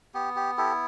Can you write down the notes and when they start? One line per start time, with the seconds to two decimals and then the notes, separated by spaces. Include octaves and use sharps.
0.14 B3 G4
0.36 G4
0.58 E4 G4 A4